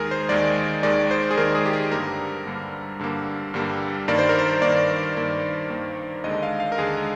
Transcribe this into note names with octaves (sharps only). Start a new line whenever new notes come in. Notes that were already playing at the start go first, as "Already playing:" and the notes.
Already playing: D#2 D#3 G#3 G#4 A#4
C5
D#2 D#3 G#3 D5
D#2 D#3 G#3 D5
C5
G#4
D#2 D#3 G#3 A#4
G#4
G4
G#4
G2 D3 G3 A#3 A#4
G2 D3 G3 A#3
G2 D3 G3 A#3
G2 D3 G3 A#3
G2 D#3 A#3 D5
C5
A#4
C5
G2 D#3 A#3 D5
G2 D#3 A#3
G2 D#3 A#3
D#2 D3 G#3 D#5
F5
F5
A#4
D#2 D3 G#3 G#4